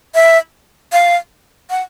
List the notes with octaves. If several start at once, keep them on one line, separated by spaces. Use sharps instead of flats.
E5
F5
F#5